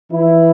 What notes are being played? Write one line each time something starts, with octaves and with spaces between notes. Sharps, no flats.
E3 E4